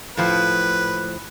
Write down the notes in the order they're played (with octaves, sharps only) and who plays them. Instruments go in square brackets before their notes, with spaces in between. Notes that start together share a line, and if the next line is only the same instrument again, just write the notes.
[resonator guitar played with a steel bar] A2 F3 [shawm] B4